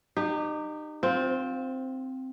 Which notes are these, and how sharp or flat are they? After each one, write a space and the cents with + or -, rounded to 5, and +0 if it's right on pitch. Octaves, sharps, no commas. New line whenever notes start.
D#4 -30 G4 +0
C4 +0 F4 +25